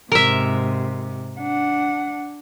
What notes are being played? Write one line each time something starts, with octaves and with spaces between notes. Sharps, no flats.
G#2 C3 A#4 E5
D4 F#5